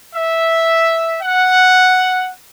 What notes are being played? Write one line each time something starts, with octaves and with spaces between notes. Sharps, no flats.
E5
F#5